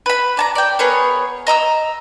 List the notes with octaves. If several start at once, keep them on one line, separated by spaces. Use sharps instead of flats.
B4 B5
D5 A5 A#5
D5 G5
B3 G#4 A#4 C#5
D#5 A#5 D#6 E6